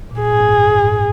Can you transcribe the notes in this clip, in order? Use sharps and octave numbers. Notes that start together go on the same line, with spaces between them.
A#2
G#4
G#2
F#2
G#2